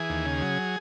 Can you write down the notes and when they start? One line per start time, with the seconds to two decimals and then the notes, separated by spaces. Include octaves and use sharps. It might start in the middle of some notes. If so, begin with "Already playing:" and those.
Already playing: E3 G#4
0.10 D#2
0.25 C#3
0.42 F#3